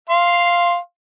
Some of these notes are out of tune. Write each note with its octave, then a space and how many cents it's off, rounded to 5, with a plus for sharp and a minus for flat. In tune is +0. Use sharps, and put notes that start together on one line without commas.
F5 -5 C6 +10